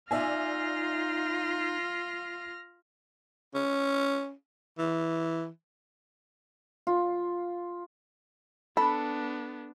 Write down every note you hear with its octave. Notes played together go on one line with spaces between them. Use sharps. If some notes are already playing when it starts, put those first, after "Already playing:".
D#4 F4 D5 E5 G#5 F6 A#6
C#4
E3
F4
B3 D4 A4 B5